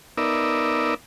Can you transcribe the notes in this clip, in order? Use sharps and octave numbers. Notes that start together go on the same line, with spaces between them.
B3 D#4 A#4 D5 E5